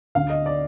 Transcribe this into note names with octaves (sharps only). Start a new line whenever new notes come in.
D2 D3 F5
D#5
D5